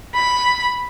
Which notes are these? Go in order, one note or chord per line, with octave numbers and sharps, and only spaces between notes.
B5